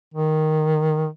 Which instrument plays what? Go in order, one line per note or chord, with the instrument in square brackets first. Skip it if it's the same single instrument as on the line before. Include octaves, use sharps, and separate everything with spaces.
[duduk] D#3